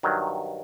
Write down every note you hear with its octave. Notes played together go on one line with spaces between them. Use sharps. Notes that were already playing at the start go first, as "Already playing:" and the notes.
G2 D#3 F#3